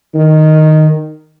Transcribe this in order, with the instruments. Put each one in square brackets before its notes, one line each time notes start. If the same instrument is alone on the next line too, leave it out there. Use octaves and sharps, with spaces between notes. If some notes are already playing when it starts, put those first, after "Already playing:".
[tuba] D#3